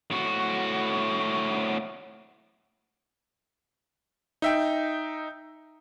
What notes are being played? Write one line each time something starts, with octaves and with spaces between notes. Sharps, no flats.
A2 F#4
D#4 E5 G5